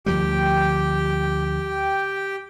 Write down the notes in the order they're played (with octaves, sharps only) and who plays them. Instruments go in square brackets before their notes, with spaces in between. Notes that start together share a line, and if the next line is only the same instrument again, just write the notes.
[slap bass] D2 F3 G3 [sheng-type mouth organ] G4 G5